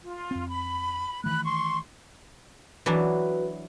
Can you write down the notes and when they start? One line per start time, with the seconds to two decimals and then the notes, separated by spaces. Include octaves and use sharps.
0.03 F4
0.31 F2 C4
0.48 B5
1.24 D#3 E3 A3 B5 F#6
1.43 C6 C#6
2.86 E3 F#3 D4 F#4 B4